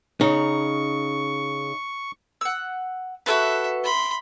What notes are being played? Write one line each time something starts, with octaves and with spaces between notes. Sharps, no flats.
C#3 D#4 C#6
F#5 E6
F#4 A4 B4 E5
B5 C6